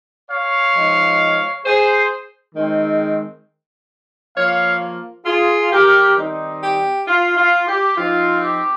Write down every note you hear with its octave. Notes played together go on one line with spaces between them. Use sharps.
C#5 F5
F3 G#3 D#4
G#4 C5
D#3 G#3 C4
F3 A#3 F4 C#5 F5
F4 G#4
G4 A#4
D#3 G3 C4 D#4
G4
F4
F4
G4
F3 C4 D#4 F4
G4